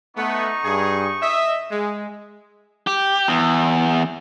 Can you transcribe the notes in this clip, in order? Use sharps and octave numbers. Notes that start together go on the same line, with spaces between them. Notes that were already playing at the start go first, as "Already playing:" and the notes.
A3 B3 D#4 C#6
G2 G#4
D#5 E5
G#3
G4
E2